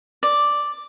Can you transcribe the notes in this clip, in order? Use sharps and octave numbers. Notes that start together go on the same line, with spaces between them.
D5